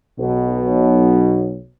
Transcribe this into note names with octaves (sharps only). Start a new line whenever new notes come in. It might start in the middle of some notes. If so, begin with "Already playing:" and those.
B1 B2